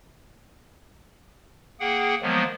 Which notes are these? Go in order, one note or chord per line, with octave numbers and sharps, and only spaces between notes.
A#3 G#4 F#5 G5
D#3 F3 F#3 G#3 A#3 B3